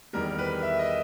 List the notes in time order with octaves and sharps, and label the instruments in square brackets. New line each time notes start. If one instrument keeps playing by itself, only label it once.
[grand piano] E2 D#3 G3 A#4
B4
E5
D#5